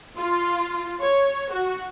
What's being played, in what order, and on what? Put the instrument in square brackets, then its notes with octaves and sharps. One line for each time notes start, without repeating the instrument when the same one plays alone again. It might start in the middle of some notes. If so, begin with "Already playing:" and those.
[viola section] F4
C#5
F#4